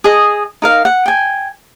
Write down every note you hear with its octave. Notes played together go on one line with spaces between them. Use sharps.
G#4 D#5
D#4 A#4 F5
F#5
G5 G#5